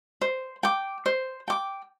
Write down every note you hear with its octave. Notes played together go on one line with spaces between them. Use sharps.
C5
G5 D6
C5
G5 D6